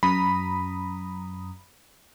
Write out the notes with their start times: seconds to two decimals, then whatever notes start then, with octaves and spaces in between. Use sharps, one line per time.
0.03 F#2 A#5 B5 D#6